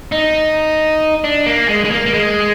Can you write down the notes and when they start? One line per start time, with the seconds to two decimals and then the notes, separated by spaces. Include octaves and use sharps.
0.12 D#4
1.24 D4
1.46 A#3
1.69 G#3
1.85 G#3
1.90 A#3
2.06 A#3
2.14 G#3